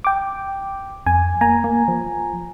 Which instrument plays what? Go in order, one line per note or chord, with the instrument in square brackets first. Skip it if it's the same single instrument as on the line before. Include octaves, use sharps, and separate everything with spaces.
[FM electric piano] G5 D6
[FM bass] F2 [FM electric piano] G#5
[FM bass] A#3 [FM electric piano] G#5 A#5
[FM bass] A#3
F3